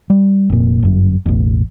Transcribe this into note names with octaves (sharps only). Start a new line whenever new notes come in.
G3
F1 A#2
G1 F#2
E1 A1